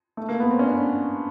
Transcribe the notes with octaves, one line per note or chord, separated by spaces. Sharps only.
A3
A#3
B3
C4
C#4
D4